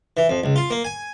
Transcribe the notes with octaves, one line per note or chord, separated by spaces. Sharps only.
E3
F2
C#2
F4
A#3
G#5